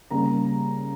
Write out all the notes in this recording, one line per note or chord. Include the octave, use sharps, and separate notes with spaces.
C#3 G3 A#3 A#5